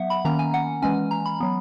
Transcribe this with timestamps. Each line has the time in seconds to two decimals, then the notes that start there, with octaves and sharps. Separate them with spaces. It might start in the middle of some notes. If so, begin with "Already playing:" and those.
Already playing: F#3 B3 E5 F#5
0.10 B5
0.25 D#3 A#3 C#4 A#5
0.39 G#5
0.54 F#5
0.82 E3 G#3 C#4 G#5
1.11 A#5
1.26 B5
1.40 F#3 B3